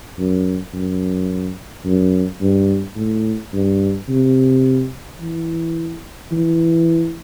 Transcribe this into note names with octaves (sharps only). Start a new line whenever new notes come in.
F#2
F#2
F#2
G2
A2
G2
C3
E3
E3